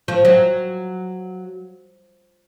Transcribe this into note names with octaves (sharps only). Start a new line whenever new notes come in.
F3
F#3